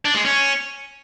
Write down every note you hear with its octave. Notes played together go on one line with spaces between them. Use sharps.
D4
G#3
C#4